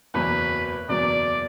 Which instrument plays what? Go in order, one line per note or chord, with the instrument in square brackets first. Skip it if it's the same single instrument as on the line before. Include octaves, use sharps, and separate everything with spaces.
[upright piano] F#1 E2 B2 F#3 [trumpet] B4
[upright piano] F#1 E2 B2 F#3 [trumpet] D5